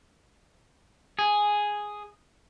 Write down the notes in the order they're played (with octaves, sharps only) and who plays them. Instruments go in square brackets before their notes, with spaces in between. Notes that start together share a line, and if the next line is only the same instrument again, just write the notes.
[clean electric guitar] G#4